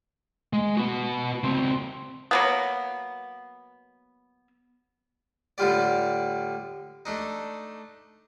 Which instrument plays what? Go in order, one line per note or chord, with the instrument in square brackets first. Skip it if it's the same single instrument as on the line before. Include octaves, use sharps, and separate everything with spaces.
[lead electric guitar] G#3
B3 F#4
C#2 C4
[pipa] F#3 A#3 B3
[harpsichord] A2 D3 G3 F4 G4 D5
A3 D4 D#4